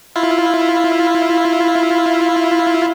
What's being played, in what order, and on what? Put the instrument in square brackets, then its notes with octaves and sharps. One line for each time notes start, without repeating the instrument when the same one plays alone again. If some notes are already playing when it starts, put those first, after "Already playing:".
[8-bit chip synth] E4 F4